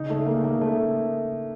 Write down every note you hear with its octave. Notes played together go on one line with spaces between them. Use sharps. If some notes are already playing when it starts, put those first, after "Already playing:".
Already playing: C#3 D#4
A3
A#3
A#3
A3